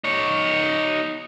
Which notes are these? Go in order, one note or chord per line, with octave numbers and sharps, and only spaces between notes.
D#4 C#5